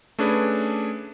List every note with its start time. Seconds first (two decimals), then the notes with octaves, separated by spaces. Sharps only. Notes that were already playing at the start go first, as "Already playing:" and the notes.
0.19 A3 C#4 D4 G#4 B4